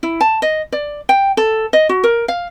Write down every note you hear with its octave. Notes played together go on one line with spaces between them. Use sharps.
E4
A5
D#5
D5
G5
A4
D#5
F#4
A#4
F5